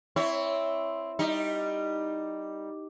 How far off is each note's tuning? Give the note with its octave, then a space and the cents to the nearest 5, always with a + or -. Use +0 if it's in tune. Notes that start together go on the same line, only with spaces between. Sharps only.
C4 +0 E4 +0 C#5 +20
G3 +0 D#4 +0